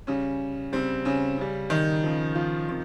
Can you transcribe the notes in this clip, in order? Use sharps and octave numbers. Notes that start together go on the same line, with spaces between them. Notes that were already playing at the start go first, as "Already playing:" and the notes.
C#3 G3 C#4
C#3 G3 C4
C#3 C#4
C#3 G3
D#3 D#4
C#3 F3
F3 F4
C3 D#3